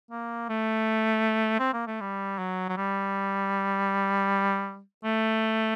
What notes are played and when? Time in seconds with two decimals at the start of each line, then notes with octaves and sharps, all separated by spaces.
0.11 A#3
0.49 A3
1.59 C4
1.74 A#3
1.87 A3
2.01 G3
2.38 F#3
2.69 F#3
2.77 G3
5.04 A3